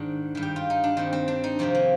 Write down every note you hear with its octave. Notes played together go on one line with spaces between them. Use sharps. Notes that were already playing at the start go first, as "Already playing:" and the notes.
Already playing: G#2 D#3 D4
G2 D#3
G4
F4
D#4
D4
G2 D#3 C4
C4
D4
D#4
F2 C3 D#3 C4
A#3